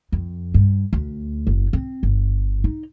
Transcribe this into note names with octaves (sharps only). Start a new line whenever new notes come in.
F2
G2
D2
F#1
C4
G1
D#4